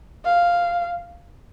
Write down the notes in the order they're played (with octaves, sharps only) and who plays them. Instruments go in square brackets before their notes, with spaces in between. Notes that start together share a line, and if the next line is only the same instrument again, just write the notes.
[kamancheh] F5